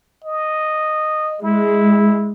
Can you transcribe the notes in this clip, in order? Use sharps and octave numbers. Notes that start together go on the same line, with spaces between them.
D#5
G#3 E4